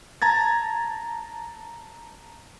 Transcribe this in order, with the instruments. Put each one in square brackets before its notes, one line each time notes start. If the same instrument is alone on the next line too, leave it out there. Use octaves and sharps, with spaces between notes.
[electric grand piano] A5 A#5 G#6 A6